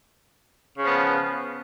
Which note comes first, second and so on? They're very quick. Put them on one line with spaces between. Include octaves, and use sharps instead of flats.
C#3 F3 B3